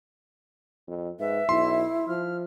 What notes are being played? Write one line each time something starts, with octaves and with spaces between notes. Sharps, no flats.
F2
G#2 B4 E5
B1 E4 C6
F3 F6